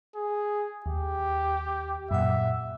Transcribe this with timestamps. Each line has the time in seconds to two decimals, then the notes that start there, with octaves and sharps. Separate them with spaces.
0.15 G#4
0.86 D#2 G4
2.11 F#2 A#2 E5 F#5